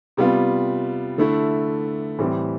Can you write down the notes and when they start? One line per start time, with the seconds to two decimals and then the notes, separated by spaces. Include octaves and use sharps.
0.17 C3 G3 B3 F4
1.18 D3 A3 E4
2.19 A2 E3 G3 C4